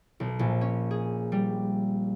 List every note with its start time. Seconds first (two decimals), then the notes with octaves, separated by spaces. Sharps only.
0.20 B1
0.39 A#1
0.61 C#4
0.91 G#4
1.32 G3